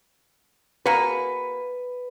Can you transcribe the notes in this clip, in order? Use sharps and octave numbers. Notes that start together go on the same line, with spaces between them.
A#3 F#4 G#4 B4